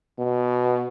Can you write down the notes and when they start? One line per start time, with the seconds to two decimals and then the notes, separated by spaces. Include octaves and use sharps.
0.19 B2